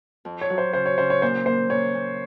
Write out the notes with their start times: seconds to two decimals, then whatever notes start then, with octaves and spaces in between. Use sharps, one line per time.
0.25 F2
0.41 C#5
0.50 F#3
0.58 C5
0.73 C#3 C5
0.86 C#5
0.98 C#3 C5
1.10 C#5
1.22 A#2 C5
1.46 A#3 C5
1.70 A#2 C#5
1.95 A#2